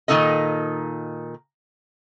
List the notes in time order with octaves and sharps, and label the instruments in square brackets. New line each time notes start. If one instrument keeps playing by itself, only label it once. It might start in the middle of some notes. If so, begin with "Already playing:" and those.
[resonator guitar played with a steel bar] A#2 D#3 F#3 D#4 A4 D#5